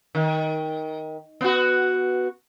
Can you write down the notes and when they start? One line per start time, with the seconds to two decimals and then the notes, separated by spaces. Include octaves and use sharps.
0.15 D#3
1.41 B3 F#4